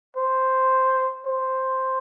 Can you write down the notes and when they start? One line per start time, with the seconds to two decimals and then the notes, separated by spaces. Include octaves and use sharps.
0.17 C5
1.26 C5